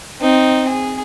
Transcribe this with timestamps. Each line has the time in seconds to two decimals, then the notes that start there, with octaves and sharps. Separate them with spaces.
0.21 C4 D#4
0.69 G#4